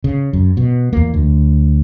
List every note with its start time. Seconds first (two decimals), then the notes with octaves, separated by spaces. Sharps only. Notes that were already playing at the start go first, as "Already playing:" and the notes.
0.04 C#3
0.33 F#2
0.57 B2
0.93 E2 A#3
1.14 D2